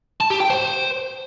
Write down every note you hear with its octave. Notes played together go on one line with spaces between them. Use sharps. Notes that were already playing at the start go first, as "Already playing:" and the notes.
A5
G4
G5
C5